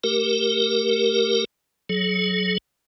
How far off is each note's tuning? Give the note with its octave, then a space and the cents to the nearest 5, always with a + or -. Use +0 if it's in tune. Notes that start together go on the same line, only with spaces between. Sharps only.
A3 +0 G4 +0 A#4 +0
F#3 +0 G#4 +45